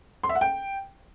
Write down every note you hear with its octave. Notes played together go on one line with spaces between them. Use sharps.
C6
E5
F#5
G5